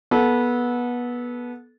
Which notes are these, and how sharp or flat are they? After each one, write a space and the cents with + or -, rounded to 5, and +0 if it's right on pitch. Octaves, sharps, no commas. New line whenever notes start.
B3 -20 A4 -20